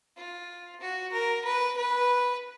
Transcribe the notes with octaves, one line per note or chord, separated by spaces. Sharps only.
F4
F#4
A#4
B4
B4